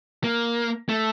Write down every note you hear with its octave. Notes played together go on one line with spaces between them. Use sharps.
A#3
A3